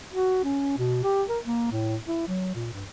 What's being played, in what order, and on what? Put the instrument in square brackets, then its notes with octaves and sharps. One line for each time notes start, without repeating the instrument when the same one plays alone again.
[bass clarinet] F#4
C#4
B2
G4
A#4
A#3
A2
E4
F#3
A#2
G2